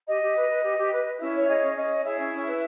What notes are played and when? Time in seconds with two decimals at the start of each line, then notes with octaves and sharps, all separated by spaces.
0.07 G4 D#5
0.21 G4
0.35 B4
0.49 B4
0.63 G4
0.78 G4
0.92 B4
1.05 B4
1.20 C#4 E4 E5
1.34 C#5
1.47 G#4 D#5
1.62 C#4
1.76 C#4 D#5
1.90 C#5
2.04 E4 G#4 E5
2.18 C#4
2.32 C#4
2.47 B4